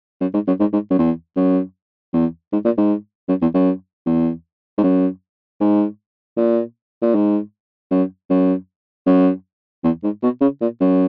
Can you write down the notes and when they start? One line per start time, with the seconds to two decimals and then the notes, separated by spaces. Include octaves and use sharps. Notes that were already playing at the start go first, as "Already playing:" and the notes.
0.21 F#2
0.34 G#2
0.47 F#2
0.60 G#2
0.73 G#2
0.90 F#2
0.99 E2
1.37 F#2
2.14 E2
2.52 G#2
2.65 A#2
2.78 G#2
3.29 F#2
3.42 E2
3.54 F#2
4.06 E2
4.78 G#2
4.83 F#2
5.60 G#2
6.37 A#2
7.02 A#2
7.15 G#2
7.91 F#2
8.30 F#2
9.06 F#2
9.84 E2
10.03 G#2
10.23 B2
10.41 C#3
10.61 A#2
10.81 F#2